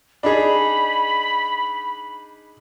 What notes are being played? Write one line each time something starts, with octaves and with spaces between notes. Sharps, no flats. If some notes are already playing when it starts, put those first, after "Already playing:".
D4 D#4 G#4 B5